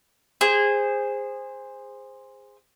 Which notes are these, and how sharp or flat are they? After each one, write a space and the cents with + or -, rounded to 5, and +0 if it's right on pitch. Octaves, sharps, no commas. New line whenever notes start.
G#4 -20 C5 +0